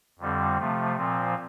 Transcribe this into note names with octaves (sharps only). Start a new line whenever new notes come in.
F2 D3 G3 C4
C3 F3 A3
A#2 F3 C4